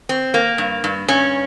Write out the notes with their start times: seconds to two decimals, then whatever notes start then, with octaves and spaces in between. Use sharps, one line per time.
0.09 C4
0.34 A#3
0.58 G2
0.84 G2
1.08 G2 C#4